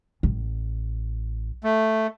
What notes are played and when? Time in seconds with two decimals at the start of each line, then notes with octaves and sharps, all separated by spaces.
0.23 A1
1.64 A3